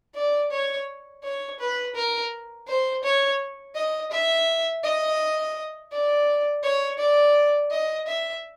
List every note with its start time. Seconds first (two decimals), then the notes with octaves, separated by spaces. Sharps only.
0.15 D5
0.51 C#5
1.24 C#5
1.59 B4
1.95 A#4
2.67 C5
3.03 C#5
3.75 D#5
4.11 E5
4.83 D#5
5.91 D5
6.63 C#5
6.98 D5
7.71 D#5
8.07 E5